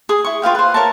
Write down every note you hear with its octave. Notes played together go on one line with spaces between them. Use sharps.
G#4 D#6
E4 C#6
F4 B4 F5 G5
B4 C5
A#4 C#5 E5 A5